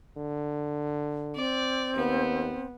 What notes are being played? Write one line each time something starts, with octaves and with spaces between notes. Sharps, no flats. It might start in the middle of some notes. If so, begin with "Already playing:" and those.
D3
C4 D5
D#2 B3